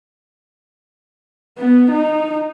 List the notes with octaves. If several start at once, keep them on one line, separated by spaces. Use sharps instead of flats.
B3
D#4